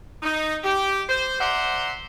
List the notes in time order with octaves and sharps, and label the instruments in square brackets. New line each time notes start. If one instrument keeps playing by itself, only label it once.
[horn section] D#4
G4
C5
C5 D5 E5 F#5 A#5 C6